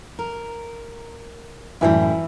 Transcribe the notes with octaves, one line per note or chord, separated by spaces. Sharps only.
A#4
F#2 A2 E3 G3 E4